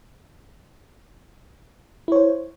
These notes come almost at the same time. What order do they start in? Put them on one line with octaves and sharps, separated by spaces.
E4 C#5 C5